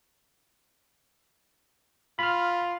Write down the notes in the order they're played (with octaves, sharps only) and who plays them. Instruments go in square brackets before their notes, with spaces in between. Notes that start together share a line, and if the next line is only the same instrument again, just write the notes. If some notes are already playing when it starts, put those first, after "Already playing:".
[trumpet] F4 [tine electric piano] B5 F6